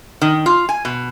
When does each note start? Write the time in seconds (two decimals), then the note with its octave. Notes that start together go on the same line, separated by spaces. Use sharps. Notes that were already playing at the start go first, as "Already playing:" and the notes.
0.22 D#3
0.46 F4
0.69 G#5
0.85 B2